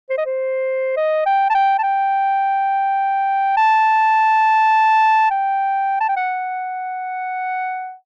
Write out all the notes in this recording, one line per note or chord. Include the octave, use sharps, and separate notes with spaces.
C5
D#5
C5
D#5
G5
A5
G5
A5
G5
A5
G5
A5
G5
F#5